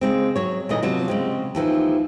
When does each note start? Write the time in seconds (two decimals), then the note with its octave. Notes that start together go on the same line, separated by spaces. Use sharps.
0.01 C#3 G#3 C4
0.36 F#3 C#5
0.69 D2 A#2 D3 E3 D#5
0.83 C3 F3 F#3 B3
1.08 C#3 G#3 C4
1.55 D#2 E3 F3